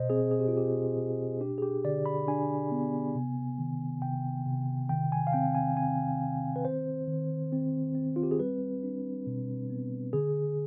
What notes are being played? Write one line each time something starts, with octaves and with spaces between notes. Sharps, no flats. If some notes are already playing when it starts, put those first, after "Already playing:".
Already playing: B2 C5 D#5
C4 G#4
G#4
G4
F4
B2 G4
B2
D4 G4
G#4
G4
D3 D5
B5
D4 G#5
B3
C3
D#3
C3 G5
C3
D#3 G5
G#5
F5
C4 G5
G#5
C4 G#5
D#3
B4
C4 C5
D#3
C4
C4
F4
G4
G#4
G3 B4
D4
B2
B3
D3 G#4